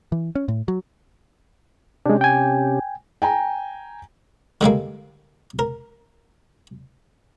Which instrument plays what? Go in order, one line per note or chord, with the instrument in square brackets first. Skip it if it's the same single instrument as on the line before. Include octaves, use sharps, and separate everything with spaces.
[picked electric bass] E3
C#4
A2
F#3
[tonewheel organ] C3 C#4 G4 [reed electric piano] G#3 D4
[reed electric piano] G5 G#5
[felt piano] G5 G#5 A#5
[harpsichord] D3 G3 G#3 A#3
A#4